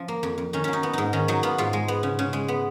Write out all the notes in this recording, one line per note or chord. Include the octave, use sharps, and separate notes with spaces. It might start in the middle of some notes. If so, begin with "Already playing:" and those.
Already playing: F3 C#4
A#3
F2
F2
D#3 C#4
F#3 C#4
D#4
B3
G#2 D#4
D#3 C#4
F#3 D#4
B3 F4
G#2 F4
G#3
B3
C#3
C#3
G#3
B3